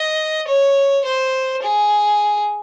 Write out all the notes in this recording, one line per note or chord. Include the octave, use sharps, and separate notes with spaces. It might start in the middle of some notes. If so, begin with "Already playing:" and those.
Already playing: D#5
C#5
C5
G#4